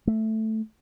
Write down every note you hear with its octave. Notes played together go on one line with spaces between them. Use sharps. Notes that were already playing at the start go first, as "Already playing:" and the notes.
A3